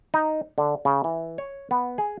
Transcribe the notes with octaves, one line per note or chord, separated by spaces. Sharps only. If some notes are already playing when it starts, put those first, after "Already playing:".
D#4
D3
C#3
E3
C#5
B3
G#4